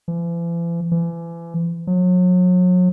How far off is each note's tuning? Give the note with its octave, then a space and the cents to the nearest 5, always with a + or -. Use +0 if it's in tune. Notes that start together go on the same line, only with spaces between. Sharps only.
E3 +45
E3 +35
F#3 -35